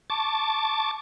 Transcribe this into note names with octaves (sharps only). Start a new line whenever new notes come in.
A5 C#6 D6 A6